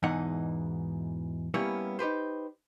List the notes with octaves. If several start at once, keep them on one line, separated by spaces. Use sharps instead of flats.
E2 G#2 B2 E3 D#4 F#5
G3 A#3 B3 C#4 E4 C#5
D#4 G4 B4 C5